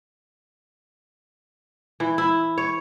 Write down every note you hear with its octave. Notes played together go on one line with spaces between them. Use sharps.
E3
E4
C#5